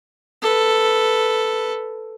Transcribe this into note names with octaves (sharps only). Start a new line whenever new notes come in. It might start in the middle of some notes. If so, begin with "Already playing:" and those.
A4 B4